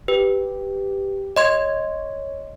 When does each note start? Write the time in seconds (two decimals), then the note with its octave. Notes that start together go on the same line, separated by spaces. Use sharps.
0.08 G4 B4
1.36 C#5 D#5 C6 G#6